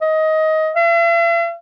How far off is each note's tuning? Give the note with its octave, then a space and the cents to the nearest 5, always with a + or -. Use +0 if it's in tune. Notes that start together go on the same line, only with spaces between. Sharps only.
D#5 +15
E5 +45